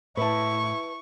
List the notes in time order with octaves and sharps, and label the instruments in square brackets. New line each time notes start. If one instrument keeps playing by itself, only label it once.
[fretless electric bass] A2 [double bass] E4 [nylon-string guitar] B4 A5 [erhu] C#6